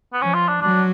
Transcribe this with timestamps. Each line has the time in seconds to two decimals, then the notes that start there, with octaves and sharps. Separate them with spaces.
0.13 B3
0.21 F3 C#4
0.35 F4
0.48 D4
0.62 F#3 D4